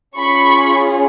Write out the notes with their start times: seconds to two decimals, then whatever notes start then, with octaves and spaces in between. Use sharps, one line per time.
0.17 C#4 F4 G#4 B5 C#6